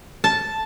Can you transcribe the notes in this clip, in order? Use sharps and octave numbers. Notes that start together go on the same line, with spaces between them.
A5